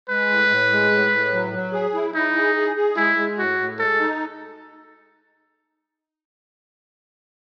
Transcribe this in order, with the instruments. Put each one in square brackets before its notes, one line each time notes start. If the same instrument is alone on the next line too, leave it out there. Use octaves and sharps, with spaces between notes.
[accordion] G#3 [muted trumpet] B4
[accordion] A2
A2
G#3
A2
A2
F#3
F#3
G#4
E4
[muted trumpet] D#4 [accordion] E4
[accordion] G#4
G#4
G#4
[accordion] G#3 [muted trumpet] E4
[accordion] G#3
[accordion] A2 [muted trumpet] F#4
[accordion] A2
[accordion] G#3 [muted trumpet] A4
[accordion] D#4